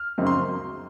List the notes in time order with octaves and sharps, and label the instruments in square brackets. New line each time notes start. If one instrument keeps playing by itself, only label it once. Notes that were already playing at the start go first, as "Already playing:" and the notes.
Already playing: [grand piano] F6
[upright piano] F#2 C#3 F#3 C4 D#4
[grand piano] C6